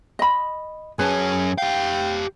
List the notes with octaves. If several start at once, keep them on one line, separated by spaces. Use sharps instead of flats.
D#5 B5
F#2 C#4 G#4 B4 A5
G4 F5 G5